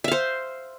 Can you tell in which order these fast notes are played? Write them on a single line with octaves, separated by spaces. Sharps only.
E5 F5 C5